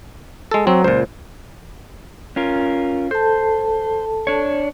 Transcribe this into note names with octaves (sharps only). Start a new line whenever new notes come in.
G#3 A4
F#3 C4
C#2 A#2 C5
C#4 F4 A#4
A4 C5 A5
D4 C#5